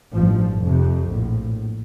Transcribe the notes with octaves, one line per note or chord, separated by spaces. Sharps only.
A1 G2 F3
F1 F2 C3
A#1 A2